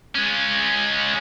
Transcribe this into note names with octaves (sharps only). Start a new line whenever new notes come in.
G#3 C#4